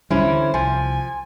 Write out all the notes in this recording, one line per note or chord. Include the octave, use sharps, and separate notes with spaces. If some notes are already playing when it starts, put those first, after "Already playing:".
D2 C#3 E3 G3 C#4 E4 C5
D3
C2 F3 G#5